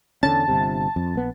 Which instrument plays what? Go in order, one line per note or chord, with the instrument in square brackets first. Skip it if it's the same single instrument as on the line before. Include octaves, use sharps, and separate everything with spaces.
[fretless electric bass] E2 D3 C#4 [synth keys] A5
[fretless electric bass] G1 C3
F2
A#1 B3